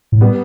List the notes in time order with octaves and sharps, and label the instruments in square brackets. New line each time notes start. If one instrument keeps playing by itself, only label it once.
[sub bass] A2
[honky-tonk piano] G3 B3